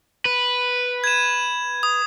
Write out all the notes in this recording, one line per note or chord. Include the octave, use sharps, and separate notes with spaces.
B4
G#6 E7
D#6